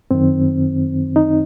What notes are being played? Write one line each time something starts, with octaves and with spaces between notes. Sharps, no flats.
F#2 D#3 C4
D#4